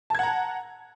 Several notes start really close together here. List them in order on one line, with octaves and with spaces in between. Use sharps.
A5 G#6 F#5 A#5